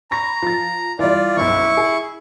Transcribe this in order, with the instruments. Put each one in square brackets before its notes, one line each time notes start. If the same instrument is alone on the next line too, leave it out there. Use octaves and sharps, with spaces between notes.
[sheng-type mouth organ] A#5 [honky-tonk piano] B5 C#6 A#6
[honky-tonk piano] F3 A6
[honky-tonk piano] E3 G3 [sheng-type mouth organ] F4 D5
[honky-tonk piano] F#1 B1 [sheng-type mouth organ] E4 C#6
[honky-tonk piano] G#4